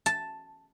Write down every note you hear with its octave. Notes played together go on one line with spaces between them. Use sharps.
A5